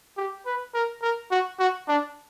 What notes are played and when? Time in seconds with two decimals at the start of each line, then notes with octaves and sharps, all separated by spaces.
0.17 G4
0.46 B4
0.74 A#4
1.02 A#4
1.31 F#4
1.59 F#4
1.88 D4